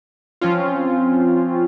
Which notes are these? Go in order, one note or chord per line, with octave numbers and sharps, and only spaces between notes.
F3 C4 C#4 F4